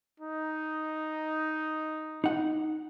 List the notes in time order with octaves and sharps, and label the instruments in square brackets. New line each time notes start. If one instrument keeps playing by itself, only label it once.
[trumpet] D#4
[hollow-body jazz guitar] D#4 F#5